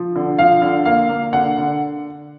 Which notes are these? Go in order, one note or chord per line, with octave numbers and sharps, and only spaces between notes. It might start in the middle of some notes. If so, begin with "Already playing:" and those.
Already playing: F3
D3
F3 F5
D3
A#3 F5
A#3
D3 F#5
D3